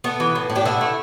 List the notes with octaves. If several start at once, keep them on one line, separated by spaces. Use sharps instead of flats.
A3 B3
E3
A2
A2
D4 G4
D3 B3 E4
A3